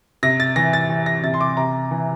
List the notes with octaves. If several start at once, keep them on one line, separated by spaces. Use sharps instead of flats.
C3 A#6
A6
E3 A#6
A6
E3
A#6
C3 A6
C6
D6
C3 A#5
E3